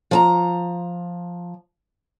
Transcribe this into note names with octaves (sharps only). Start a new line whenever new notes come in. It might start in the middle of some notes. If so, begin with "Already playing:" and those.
F3 A5 A#5